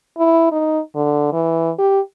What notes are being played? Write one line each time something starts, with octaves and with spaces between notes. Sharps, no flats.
E4
D#4
D3
E3
G4